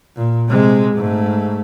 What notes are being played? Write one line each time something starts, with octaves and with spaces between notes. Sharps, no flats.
A#2
C3 G#3
G#2 A3